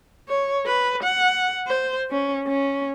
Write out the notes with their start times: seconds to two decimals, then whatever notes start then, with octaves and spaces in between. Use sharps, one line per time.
0.28 C#5
0.66 B4
1.03 F#5
1.67 C5
2.11 C#4
2.47 C#4